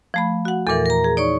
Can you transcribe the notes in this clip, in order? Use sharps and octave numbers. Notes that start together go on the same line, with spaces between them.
F3 A3 B5
F#4 F#5
E2 A#2 E3 A4 A#4
A#4 A#5
G#4
D#4 C#5 D5 C#6